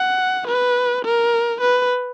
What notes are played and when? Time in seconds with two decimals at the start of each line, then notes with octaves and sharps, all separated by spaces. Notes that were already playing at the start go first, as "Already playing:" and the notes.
Already playing: F#5
0.48 B4
1.05 A#4
1.61 B4